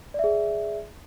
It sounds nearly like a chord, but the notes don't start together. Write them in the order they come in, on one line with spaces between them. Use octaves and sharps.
D5 E5 G#4